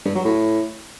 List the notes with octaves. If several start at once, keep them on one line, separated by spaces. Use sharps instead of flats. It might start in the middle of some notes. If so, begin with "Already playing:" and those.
G2
F#3
A2